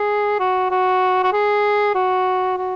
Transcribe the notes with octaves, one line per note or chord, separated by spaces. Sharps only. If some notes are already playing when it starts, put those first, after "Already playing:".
Already playing: G#4
F#4
F#4
F#4
G#4
F#4
F#4